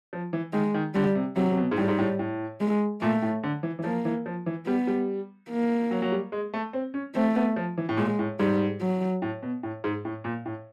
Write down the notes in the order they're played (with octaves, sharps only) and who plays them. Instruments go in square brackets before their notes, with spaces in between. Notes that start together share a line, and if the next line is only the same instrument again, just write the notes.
[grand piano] F3
E3
[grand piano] D#3 [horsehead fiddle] G#3
[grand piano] D#3
[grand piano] D3 [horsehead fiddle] G3
[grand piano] C3
[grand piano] C3 [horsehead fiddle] F#3
[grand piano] C3
B2
G#2
[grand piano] A2 [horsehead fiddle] G3
[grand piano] G#2
A2
A2
[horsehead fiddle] G#3
[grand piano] A#2 [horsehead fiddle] A3
[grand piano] A2
D3
E3
E3
[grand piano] F3 [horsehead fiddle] A#3
[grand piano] E3
F3
E3
[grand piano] G3 [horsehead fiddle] B3
[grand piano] G3
[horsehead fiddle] A#3
[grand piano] F#3
F#3
G3
G#3
A3
C4
C#4
[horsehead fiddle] A3 [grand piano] C4
[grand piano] B3
F3
E3
A2
[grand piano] A#2 [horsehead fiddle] G#3
[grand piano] A2
[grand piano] G#2 [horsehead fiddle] G3
[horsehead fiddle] F#3
[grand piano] A2
B2
A2
G#2
A2
A#2
A2